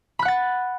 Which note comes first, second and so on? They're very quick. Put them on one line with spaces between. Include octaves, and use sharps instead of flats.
B5 F#6 F#5 A6